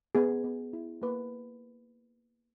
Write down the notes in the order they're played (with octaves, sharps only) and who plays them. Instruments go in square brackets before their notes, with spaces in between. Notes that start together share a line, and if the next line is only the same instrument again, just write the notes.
[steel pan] B3 G#4
B3
E4
A#3 B4